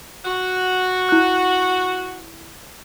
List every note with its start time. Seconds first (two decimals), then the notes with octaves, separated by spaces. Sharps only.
0.25 F#4
1.09 E4 F#6